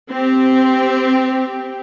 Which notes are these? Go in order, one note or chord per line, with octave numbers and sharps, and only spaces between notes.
C4 G4